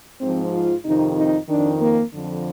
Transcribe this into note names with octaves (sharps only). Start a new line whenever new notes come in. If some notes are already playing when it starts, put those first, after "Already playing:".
G#2 F3 C4
F4
F2 C3 D#3 D#4
D#4
F2 D#3 D4
A#3
F2 D3 F3